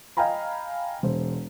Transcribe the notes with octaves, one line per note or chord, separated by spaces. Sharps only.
D#5 F5 G5 G#5 A#5 B5
E1 C5